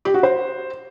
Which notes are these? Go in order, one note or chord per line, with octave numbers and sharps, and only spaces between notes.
G4
F#4
C5